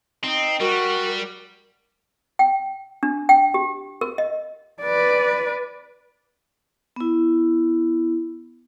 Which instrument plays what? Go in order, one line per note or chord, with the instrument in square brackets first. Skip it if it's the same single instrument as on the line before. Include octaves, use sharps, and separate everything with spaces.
[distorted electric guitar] C4 [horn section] D#4
[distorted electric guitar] G3 [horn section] F#4 [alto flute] A#4
[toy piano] G5
D4
G5
G4
A#4
D#5
[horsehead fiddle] B4 D5
[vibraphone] B3 E4